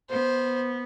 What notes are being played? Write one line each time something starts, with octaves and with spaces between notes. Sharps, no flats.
B3 C5